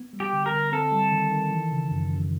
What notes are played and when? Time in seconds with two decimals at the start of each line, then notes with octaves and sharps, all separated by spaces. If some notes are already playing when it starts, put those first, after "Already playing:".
Already playing: B3
0.13 G3
0.20 G4
0.33 D3
0.46 A#4
0.52 D3
0.72 C4 A4
0.92 G3
1.12 D#3
1.31 D#3
1.51 E3
1.72 C#3
1.91 F#2
2.11 F#2